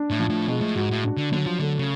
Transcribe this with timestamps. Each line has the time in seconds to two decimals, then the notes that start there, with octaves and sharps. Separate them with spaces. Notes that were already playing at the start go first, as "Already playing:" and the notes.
Already playing: D4
0.10 A2
0.19 F3
0.30 A2
0.48 B2 G#3
0.62 A2
0.76 G#2 F#4
0.90 A2
1.04 D4
1.17 D3
1.32 D3 F#3
1.46 F3
1.60 D3 A3
1.79 C#3